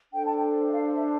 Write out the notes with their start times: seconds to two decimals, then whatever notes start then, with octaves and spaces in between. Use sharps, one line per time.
0.13 D4 A4 C5 G5
0.25 A5
0.37 G5
0.68 E5
0.73 F5
0.93 E5